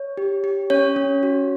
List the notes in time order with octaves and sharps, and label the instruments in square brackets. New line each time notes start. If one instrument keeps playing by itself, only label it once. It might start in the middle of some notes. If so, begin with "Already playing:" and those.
Already playing: [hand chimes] C#5
G4
G4
C#4 C#5
C#4
F#4